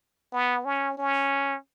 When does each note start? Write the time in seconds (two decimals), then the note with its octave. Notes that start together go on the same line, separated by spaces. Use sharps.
0.32 B3
0.65 C#4
0.98 C#4